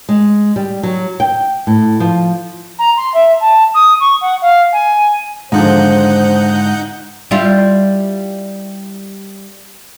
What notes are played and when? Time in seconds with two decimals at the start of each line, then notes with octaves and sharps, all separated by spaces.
0.09 G#3
0.56 G3
0.83 F#3
1.20 G5
1.67 A2
2.00 F3
2.78 A#5
2.96 C6
3.13 E5
3.40 A5
3.74 D#6
4.00 C#6
4.21 F#5
4.41 F5
4.72 G#5
5.52 G#2 D3 D#3 F3 D#4 C5 F#5 G6
7.31 G3 E4 F4